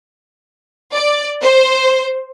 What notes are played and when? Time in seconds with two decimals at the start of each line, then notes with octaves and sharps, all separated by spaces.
0.94 D5
1.41 C5